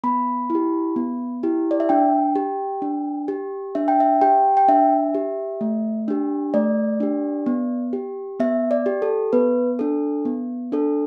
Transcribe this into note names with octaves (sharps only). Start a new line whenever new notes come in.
B3 B5
E4
G4
B3
E4 G4
D5
E5
D4 G5
G4
D4
G4
D4 E5
G5
E5
G4 G5
G5
D4 E5
G4
A3
D4 G4
A3 D5
D4 G4
B3
G4
B3 E5
D5
G4
A4
B3 B4
D4 A4
B3
D4 A4